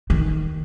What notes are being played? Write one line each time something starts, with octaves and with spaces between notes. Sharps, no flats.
D#3